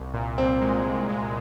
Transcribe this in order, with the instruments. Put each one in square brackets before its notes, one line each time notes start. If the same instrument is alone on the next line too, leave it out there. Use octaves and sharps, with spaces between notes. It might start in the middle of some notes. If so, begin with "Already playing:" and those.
Already playing: [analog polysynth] C2
A#2
[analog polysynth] A#2 [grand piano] C4
[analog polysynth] G#3
C2
G#3